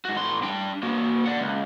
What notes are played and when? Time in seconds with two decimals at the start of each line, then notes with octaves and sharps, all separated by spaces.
0.05 G#2 F#4
0.16 A2 C6
0.43 D4 G5
0.83 A#3 F#4
1.25 D5 F#5
1.40 C#2